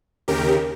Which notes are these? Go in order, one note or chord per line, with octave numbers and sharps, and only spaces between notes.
D#2 C#3 G4 A#4